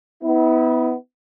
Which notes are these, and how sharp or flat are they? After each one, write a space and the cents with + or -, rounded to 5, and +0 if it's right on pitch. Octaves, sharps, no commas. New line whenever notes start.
B3 +20 E4 -30